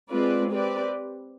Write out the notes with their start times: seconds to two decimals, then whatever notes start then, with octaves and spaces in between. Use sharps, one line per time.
0.10 G#3 C4 F4 B4 D5
0.50 C4 G4 B4 D5